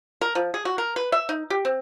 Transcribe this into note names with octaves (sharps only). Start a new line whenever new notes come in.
A#4
F3
G#4
F#4
A#4
B4
E5
D#4
G4
C4